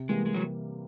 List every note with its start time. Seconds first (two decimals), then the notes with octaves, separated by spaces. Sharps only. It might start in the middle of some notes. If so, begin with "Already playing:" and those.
Already playing: C3
0.09 E3 G3 G#3 A#3
0.26 G#3
0.34 F#3